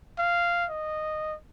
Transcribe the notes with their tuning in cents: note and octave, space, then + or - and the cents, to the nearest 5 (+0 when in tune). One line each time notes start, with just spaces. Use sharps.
F5 -10
D#5 -10